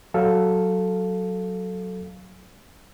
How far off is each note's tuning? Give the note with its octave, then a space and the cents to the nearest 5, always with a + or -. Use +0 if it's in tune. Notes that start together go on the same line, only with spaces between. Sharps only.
F#3 +0 A4 +0 F5 +0